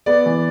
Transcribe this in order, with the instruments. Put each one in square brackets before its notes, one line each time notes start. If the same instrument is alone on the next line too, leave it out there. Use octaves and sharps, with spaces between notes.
[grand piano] B3 D5
E3